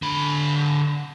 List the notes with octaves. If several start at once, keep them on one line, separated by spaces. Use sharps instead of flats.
D3 B5